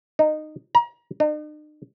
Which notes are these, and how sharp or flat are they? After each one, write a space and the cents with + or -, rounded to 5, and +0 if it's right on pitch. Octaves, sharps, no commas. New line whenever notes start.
D#4 -15
A#5 +35
D#4 -45